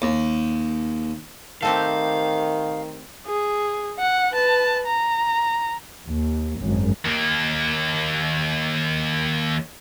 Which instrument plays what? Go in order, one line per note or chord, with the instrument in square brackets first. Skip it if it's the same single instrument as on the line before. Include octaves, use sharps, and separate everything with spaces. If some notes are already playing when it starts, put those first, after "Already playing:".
[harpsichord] D#2
[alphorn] D#3 [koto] A3 C4 G4 [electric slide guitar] F5
[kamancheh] G#4
F#5
B4 A5
A#5
[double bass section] D#2
G#1 F#2
[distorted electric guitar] D#2 A#3